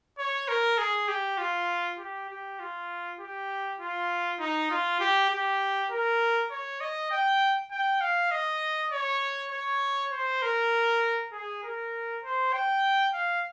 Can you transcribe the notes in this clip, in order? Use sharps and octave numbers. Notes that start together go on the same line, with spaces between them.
C#5
A#4
G#4
G4
F4
G4
G4
F4
G4
F4
D#4
F4
G4
G4
A#4
C#5
D#5
G5
G5
F5
D#5
C#5
C#5
C5
A#4
G#4
A#4
C5
G5
F5